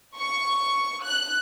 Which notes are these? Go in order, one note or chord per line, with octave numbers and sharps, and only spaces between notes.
C#6
F#6